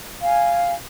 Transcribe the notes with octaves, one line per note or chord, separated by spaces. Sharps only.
F5 G#5